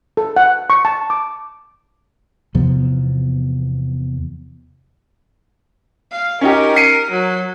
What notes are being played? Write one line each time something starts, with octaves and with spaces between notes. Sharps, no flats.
A4
F#5
C#6
A5
D6
E2 C3 F3 B3
F5
C#4 D#4 G4 A#4
C7 C#7 D#7
F#3